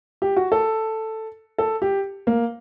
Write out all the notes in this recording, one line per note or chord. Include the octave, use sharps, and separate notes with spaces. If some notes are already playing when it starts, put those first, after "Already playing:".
G4
F#4
A4
A4
G4
A#3